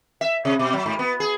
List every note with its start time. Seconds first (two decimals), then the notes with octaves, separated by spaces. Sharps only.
0.21 E5
0.45 C3
0.59 B2
0.74 F#3
0.86 G#2
0.99 B3
1.20 G#4